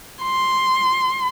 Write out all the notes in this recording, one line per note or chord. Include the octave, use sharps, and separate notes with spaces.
C6